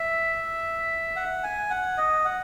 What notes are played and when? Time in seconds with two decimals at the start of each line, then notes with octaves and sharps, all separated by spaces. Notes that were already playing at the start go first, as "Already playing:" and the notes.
Already playing: E5
1.16 F#5
1.43 G#5
1.70 F#5
1.98 D#5
2.25 F#5